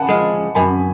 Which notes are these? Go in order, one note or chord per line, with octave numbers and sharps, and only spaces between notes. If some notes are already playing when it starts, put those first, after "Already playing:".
Already playing: F#5 G#5 A5 B5
F3 G#3
F#2 G#5 B5